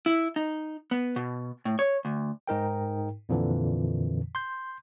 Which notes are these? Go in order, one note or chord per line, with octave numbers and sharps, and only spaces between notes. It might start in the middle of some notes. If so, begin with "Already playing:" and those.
E4
D#4
B3
B2
A2
C#5
D2
G#2 D#4 A#4 G5
F2 A#2 D3 E3
C6 G6